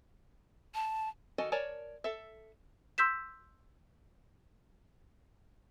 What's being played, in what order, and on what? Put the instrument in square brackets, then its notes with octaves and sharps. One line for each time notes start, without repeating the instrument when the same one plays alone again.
[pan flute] A5
[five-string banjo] D#3 F#4 A4 D#5 G#5
A#4 C#5 D5 G#5 A5
A4 E5
[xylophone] C6 E6 G6 B6 E7